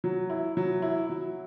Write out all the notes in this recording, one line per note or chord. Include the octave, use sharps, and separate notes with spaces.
F#3
E4
F#3
E4
F#3